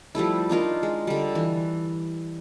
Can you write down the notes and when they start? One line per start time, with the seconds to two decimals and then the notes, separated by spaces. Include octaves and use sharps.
0.15 F3 G3 A3 E4
0.49 D4 D#4 F4 A#4
0.83 G#3
1.07 D3 G3
1.35 E3